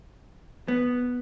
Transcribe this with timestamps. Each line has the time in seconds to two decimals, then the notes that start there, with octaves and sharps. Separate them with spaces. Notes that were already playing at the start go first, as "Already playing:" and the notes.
0.68 B3